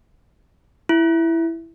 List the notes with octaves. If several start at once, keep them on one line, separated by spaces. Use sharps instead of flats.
E4